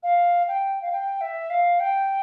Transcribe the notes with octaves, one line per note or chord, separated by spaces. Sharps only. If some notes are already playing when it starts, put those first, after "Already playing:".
F5
G5
F5
G5
E5
F5
G5